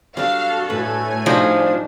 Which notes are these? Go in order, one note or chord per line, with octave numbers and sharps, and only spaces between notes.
G3 D4 F#4 A4 F5
A2 A3 B4 G#5
F3 G3 D4 D#4 F#4